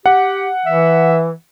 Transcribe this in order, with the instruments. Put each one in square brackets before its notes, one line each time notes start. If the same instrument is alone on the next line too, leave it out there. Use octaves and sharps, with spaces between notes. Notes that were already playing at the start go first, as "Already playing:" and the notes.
[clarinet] G4 [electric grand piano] F#5
[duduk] E3 [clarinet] E5